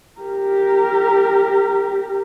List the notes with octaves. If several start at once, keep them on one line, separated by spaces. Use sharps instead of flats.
G4 A#4